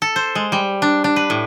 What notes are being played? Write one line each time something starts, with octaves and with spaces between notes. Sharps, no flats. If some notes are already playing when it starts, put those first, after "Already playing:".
A4
C5
G#3
G3
D4
D4
B4
A2